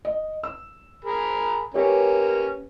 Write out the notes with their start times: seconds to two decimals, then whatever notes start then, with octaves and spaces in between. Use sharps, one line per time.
0.05 D#5
0.43 E6
1.05 G#4 A#4 B5
1.74 A#3 C#4 G4 B4 C#5